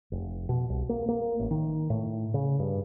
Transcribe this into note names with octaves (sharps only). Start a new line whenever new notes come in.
F1
B2
C2
A#3
A#3
A1
D#3
A2
C#3
G2